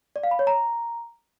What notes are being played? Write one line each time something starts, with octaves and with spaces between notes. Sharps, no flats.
D5
F5
B5
C#5
A#5